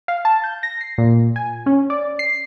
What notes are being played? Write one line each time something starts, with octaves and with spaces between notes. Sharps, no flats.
F5
A5
G6
A#6
C7
A#2
G#5
C#4
D5
C7